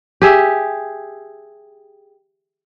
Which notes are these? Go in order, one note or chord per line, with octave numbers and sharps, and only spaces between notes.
G4 G#4 E5